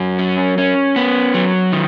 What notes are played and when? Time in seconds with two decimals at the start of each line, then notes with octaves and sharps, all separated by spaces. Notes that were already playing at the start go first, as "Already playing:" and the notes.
Already playing: F#2 F#3
0.19 C#4
0.58 C#4
0.96 B3
1.34 F#3
1.72 D#3